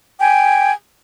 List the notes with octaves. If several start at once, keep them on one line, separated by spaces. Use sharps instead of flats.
G5 G#5